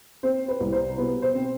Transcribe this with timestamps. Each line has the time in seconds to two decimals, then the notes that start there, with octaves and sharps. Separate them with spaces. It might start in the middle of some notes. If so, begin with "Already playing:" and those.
0.23 C4 C5
0.48 B4
0.60 C2
0.72 C5
0.98 B2 B4
1.22 C5
1.35 C4